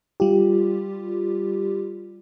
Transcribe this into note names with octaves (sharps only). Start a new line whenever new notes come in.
G3 F4 G4